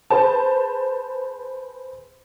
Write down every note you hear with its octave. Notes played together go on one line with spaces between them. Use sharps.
G#4 B4 C5 A5